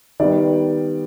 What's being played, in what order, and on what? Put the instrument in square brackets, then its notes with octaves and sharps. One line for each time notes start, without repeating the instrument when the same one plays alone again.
[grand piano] D#3 G3 B3 D5